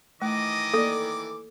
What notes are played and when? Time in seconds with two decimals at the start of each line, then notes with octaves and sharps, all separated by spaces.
0.22 D#3 E3 A3 D#5 D6
0.74 A#3 A4 D5